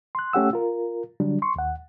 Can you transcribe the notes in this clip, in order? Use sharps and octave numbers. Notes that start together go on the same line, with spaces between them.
C6 F#6
A3 C#4 G4 F#5 E6
F4 A#4
D3 F#3 G3 D4
C6 C#6
D#2 F#5